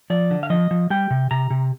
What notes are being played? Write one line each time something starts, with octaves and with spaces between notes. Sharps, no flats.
F3 D5
D3
F5
F3 D#5
F3
G3 G5
C3
C3 A#5
C3